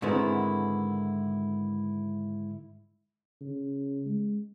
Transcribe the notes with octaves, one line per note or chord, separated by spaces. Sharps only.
G#2 D3 D#3 B3 C4 E4
C#3
G#3